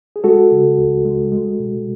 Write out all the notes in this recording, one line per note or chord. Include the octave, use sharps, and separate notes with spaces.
G#4
G#3 F#4 A4
C#3
C#2
G#3
G#3
B2